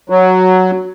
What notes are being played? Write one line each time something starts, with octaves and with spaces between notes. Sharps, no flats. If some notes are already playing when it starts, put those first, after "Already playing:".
F#3